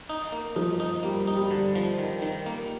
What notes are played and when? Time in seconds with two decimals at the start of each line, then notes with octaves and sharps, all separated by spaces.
0.09 D#4
0.32 A#3
0.56 F3 D#4
0.80 D#4
1.03 G3 A#3
1.27 D#4
1.35 G3
1.51 D3
1.75 F3
1.98 D#3
2.22 D#3
2.46 A#3